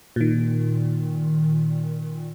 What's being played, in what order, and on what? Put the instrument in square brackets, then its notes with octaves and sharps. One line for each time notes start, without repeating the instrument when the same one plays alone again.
[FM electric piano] A#2 D#3